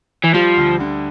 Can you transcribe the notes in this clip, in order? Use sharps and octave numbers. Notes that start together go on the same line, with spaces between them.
E3
F3 G3
D2
D3